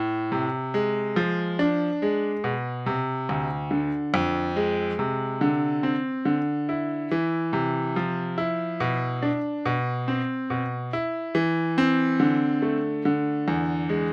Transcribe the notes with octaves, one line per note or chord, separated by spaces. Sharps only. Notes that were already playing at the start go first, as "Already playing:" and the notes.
Already playing: A2
C3
G#3
F3
D4
G#3
B2
C3
D2
D3
F2
G#3
C3
D3
C4
D3
E4
E3
C3
F3
E4
B2
D4
B2
C4
B2
E4
E3
C4
D3
A3
D3
E2
G#3